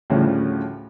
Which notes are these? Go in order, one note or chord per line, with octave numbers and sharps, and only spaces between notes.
D2 A2 C#3 F3 G3